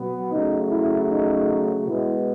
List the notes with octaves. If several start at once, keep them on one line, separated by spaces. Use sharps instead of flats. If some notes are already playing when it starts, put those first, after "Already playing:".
Already playing: B2 F#3 B3
C#3 F#3 A3 D#4
E4
D#4
B2 G#3 B3 E4